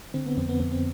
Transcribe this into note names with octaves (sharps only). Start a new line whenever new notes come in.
D3 C4
B3
F2 C4
B3
F2 B3
C4